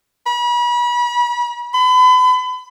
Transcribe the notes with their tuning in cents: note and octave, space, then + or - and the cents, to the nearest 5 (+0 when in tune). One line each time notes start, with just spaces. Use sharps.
B5 -35
B5 +35